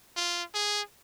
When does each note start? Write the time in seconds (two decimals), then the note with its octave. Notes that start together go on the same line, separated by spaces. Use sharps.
0.16 F4
0.54 G#4